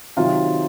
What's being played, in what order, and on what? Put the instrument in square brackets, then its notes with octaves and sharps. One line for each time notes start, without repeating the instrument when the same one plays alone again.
[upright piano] C3 D#3 F#3 F4